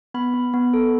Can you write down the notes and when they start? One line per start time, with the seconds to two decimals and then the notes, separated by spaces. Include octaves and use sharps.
0.14 B3 B5
0.34 B3
0.53 B3
0.74 A4